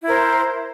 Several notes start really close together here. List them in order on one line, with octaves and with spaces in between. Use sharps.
E4 A#4 C5